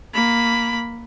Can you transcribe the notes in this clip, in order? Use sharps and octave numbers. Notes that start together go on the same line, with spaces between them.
A#3 B5